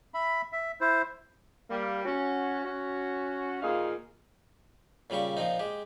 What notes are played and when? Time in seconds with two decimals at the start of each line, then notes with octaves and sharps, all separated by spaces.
0.14 E5 B5
0.52 E5
0.81 E4 C5
1.70 G3 A#3
2.04 C#4 F#4
2.65 C#4 F#4
3.62 D#2 A#2 A#3 D#4 G#4 F5
5.10 A#2 C#3 G3 G4 C#6
5.37 A#2 F3 C4 D#4
5.59 G#3 G4